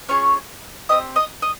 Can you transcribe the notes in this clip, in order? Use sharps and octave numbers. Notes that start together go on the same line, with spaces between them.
C#4 F4 G#4 C#5 C#6
C4 G4 D#5 D#6
D#5 D#6
D#5 D#6